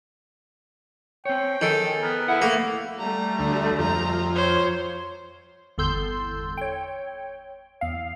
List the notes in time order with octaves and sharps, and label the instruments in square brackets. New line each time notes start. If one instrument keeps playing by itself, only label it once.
[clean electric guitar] C4 C#5 [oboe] G5
[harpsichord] D#3 [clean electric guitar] G#4 [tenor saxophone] A4
[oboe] B3 [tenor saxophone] A#4
[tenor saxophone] E4 [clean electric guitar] A4 F#5
[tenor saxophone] A3 [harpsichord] A#3
[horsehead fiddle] G3 A3 [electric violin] A#5
[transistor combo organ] D2
[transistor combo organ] F2 [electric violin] A#5
[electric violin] C5 [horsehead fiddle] C#5
[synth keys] G1 E2 A4 C6 E6 G6
C#5 G5
E2 F5